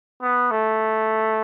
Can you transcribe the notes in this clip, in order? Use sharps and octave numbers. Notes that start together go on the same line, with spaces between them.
B3
A3